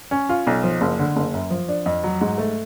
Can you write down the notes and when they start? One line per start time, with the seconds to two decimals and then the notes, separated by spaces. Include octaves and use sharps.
0.11 C#4
0.29 F4
0.47 B1
0.63 F3
0.81 F#1
0.99 D3
1.16 F#1
1.34 F#2
1.51 F3
1.68 D4
1.86 F2
2.04 F#3
2.21 G#2
2.38 A3